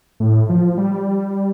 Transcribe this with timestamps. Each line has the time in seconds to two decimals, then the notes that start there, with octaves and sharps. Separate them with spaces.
0.20 A2
0.49 F3
0.77 G3